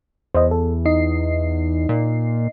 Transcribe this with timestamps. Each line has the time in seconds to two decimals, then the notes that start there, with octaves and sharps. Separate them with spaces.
0.35 E2 C5 D#5
0.51 A4
0.85 D#4 D#5 C7
1.89 A#2